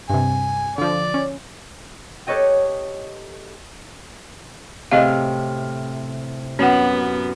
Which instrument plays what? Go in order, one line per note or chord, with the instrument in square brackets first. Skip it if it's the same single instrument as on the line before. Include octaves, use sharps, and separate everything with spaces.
[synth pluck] G2 C3 [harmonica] G#5
[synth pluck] D3 F3 [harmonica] D5
[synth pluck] C#4
[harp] G4 A4 B4 C#5 D#5 G5
[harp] A2 C3 F6 [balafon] G#4 D#5 F5
[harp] F#2 [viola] B3 [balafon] C#4 F#5